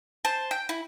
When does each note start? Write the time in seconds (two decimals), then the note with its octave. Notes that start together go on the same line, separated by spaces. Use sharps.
0.25 C5 A5
0.51 G5
0.69 E4